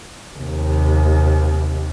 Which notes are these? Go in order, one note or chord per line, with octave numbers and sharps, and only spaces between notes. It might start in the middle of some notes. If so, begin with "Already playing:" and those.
D#2 C3